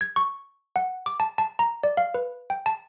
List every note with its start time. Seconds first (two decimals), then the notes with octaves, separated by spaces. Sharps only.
0.01 G#6
0.16 C#6
0.76 F#5
1.06 D6
1.20 A5
1.38 A5
1.59 A#5
1.83 D5
1.97 F5
2.14 B4
2.50 G5
2.66 A5